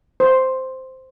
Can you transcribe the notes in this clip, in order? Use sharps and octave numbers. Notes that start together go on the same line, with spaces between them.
C5